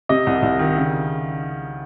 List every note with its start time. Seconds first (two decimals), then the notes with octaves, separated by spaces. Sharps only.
0.09 C3 D#5
0.27 C2
0.42 C2
0.59 D#3
0.77 C#3